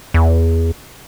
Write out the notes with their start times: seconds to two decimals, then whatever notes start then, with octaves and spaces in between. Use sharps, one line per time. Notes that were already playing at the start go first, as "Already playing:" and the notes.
0.14 E2